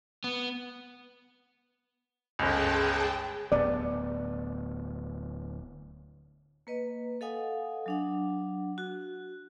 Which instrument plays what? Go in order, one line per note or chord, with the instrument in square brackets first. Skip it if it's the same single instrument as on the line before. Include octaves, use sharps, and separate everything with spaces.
[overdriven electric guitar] B3
[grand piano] G1 C#2 [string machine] G#4 G5 A5
[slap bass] D1 B3 [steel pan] D5
[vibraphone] A#3 B4 D#5
A4 D#5 F5 F#5 G#5 D#6
F#3 D4 F#5
F#4